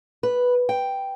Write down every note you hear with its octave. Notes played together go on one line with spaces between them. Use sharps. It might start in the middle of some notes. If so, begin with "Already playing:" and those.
B4
G5